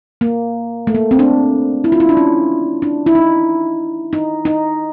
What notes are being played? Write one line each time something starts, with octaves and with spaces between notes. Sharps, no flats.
A#3
A3
A#3
C4
D4
E4
F4
E4
D4
C#4
D4
E4
D#4
D#4
D#4